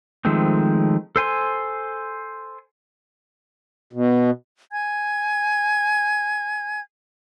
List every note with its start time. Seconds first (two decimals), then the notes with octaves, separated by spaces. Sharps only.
0.25 D#3 F3 G#3 A3 C4
1.16 A4 C5 G#5 C6
3.93 B2
4.72 G#5 G#6